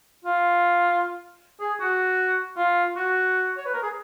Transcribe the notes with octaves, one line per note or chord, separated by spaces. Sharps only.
F4
G#4
F#4
F4
F#4
C#5
B4
A#4
G#4